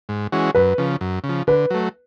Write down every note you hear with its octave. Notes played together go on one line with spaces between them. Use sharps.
G#2
E3 G#3 C#4 F#4
F#2 B4
C#3 F3
F#2
C#3
F3
D3 B4
F#3 A3